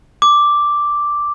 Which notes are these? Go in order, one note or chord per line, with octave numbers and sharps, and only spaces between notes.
D6